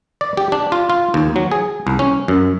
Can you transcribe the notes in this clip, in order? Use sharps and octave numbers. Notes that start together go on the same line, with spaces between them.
D5
G4
D4
F4
F4
D#2
F#3
G#4
C2
C#4
F#2